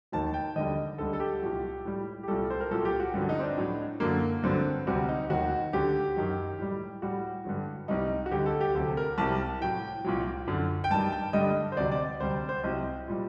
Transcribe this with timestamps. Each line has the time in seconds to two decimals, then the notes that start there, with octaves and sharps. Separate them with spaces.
0.12 D#2 D#3 F#3 A5
0.34 G5
0.56 D#2 D3 G3 D#5
0.98 D2 D3 G3 A4
1.13 A4
1.20 G4
1.42 C2 A#2 F#3
1.85 A2 G3
2.23 G4
2.28 C2 A#2 G3 A4
2.50 C5
2.60 A#4
2.71 C2 A#2 F#3 A4
2.85 G4
3.00 F#4
3.14 G2 D3 F#3
3.29 D#4
3.39 C4
3.43 D4
3.57 A2 F#3
4.00 F#2 D3 F#3 A#3
4.43 G2 D3 F#3 C4
4.87 D2 C3 G3 F#4
5.09 D#4
5.30 D#2 D#3 F#3 F#4
5.73 D2 D3 F#3 G4
6.16 F#2 D#3 F#3
6.59 A2 G3
7.02 A2 G3 F#4
7.45 G2 D3 F#3
7.88 C2 C3 G3 D#4
8.26 F#4
8.31 D2 D3 G3 G4
8.46 A4
8.61 G4
8.74 D2 C3 F#3 A4
8.97 A#4
9.18 C2 C3 G3 A5
9.61 A2 F#3 G5
10.04 C2 A#2 F#3
10.47 F#2 D3 F#3
10.84 G5
10.90 G2 D#3 G3 A5
11.12 G5
11.33 G2 D3 G3 D#5
11.72 C5
11.76 D2 C3 F#3 D5
11.91 D5
12.20 D2 C3 G3 C5
12.49 C5
12.63 C2 C3 F#3 D#5
13.08 A#2 G3